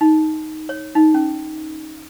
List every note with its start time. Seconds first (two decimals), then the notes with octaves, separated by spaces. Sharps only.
0.01 D#4
0.69 C#5
0.95 D#4
1.14 C#4